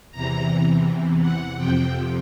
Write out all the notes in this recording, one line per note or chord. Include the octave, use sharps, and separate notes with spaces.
E2 C3 E3 A#5
F#5
F2 C3 F3 G5